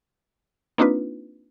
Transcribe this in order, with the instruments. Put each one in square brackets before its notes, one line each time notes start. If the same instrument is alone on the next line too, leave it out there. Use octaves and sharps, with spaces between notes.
[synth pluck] A#3 C4 D4 D#4 F4 B4